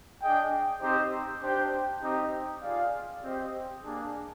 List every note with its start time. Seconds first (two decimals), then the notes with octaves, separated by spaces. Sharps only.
0.21 D4 G#4 D#5 G5
0.81 C4 D#4 G4 C5
1.41 D4 G4 C5 G5
2.01 C4 D#4 G4
2.62 F4 G#4 D5 F5
3.22 C4 G4 C5 D#5
3.82 A#3 D4 G#4